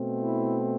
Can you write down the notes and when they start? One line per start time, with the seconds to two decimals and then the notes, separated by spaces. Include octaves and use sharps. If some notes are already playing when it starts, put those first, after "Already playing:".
Already playing: B2 A3 C4
0.20 E4